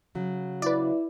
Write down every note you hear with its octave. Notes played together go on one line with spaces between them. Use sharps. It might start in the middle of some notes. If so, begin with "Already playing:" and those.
C#3 F#3
E4 B4 D5